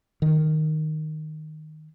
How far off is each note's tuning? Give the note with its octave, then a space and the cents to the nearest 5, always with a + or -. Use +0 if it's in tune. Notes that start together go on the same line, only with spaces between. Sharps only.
D#3 -5